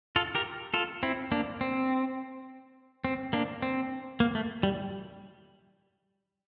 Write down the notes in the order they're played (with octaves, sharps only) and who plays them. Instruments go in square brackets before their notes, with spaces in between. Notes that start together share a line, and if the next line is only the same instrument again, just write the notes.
[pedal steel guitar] F4 A4
G4 A#4
F4 A4
C4 E4
A#3 D4
C4
C4
A#3 D4
C4
A#3
A3
G3